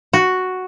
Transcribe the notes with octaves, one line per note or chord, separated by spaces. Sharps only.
F#4